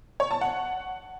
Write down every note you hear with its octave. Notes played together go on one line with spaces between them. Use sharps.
C#5
A5
F#5